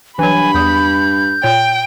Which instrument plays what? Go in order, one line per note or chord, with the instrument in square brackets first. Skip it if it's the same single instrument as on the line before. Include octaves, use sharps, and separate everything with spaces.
[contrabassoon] G2 [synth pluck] E3 F#3 [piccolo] G#5 [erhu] B5
[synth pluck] E2 D#6 [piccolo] G6
[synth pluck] A#2 C#5 [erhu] G5